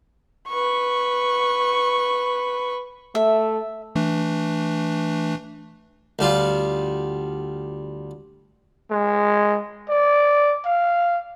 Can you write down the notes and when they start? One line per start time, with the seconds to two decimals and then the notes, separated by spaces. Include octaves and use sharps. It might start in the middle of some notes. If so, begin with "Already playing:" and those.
0.49 B4 C#6
3.15 A3 E5
3.95 E3 A3 D4
6.19 D2 G3 F4
8.91 G#3
9.89 D5
10.65 F5